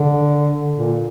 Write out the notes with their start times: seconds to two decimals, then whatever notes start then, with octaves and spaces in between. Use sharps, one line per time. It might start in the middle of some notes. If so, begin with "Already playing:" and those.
Already playing: D3
0.77 A#2